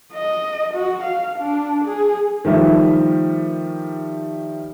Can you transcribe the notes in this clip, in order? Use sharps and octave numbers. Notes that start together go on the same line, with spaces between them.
D#5
F#4
F5
D4
G#4
D#3 F3 G3 A3